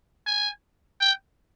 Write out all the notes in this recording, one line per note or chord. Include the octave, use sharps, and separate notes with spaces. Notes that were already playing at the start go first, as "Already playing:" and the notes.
G#5
G5